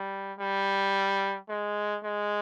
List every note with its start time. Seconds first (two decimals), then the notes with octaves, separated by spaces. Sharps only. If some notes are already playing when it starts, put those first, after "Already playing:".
Already playing: G3
0.39 G3
1.49 G#3
2.04 G#3